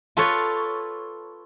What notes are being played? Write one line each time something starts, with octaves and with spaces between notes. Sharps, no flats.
F4 A4 B4 C#5